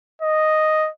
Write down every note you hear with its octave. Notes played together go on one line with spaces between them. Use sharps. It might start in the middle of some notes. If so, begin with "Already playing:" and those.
D#5